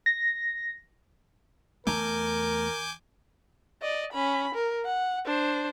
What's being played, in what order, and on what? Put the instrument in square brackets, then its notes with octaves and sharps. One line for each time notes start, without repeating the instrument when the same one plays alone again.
[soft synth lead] A#6
[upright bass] E2 [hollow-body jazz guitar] A3 A#5 [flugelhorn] A#4 [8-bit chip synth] G#5 D6 G6
[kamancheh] D5 D#5
C#4 B5
A#4
F#5
D4 C5